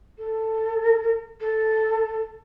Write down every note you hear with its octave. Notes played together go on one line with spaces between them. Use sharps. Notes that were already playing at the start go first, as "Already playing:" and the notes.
A4
A4